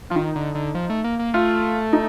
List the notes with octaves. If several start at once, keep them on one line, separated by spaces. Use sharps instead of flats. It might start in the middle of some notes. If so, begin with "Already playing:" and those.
F3 F4
D#3 D#4
D3
D3
F3
A3
A#3
A#3
A3 F4
D#4